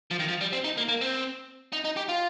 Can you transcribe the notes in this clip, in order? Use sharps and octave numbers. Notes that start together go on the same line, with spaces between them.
F3
D#3
F3
G3
C4
D#4
A#3
A#3
C4
D#4
D#4
G4
F4